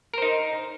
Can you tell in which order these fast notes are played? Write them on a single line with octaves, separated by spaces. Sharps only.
A#4 C5 D#4